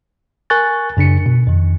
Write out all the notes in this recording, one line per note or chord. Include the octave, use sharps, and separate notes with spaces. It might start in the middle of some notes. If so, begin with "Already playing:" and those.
A#4 G#5 C#6 F#6 A6
F#2 C#3 D4 C#7
B2
F2 D#3